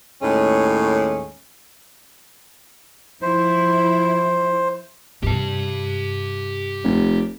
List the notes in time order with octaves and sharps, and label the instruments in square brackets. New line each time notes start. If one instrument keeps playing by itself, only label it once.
[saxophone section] D#2 A2 G#3 C#4
[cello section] F3 E4 [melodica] C5
[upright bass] G2 C3 [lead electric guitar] G4 A5
[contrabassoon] F1